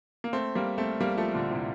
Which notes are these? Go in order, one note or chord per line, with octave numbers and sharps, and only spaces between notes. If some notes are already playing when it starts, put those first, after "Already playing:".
A#3
A3 C4
G3 A#3
A3 C4
G3 A#3
F3 A3
A#2 D3
A2 C3